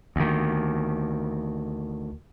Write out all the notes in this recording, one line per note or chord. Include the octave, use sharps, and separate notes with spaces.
D2 D#3